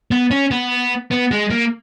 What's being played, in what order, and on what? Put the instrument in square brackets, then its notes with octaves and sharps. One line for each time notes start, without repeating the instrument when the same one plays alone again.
[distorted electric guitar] B3
C#4
B3
B3
G#3
A#3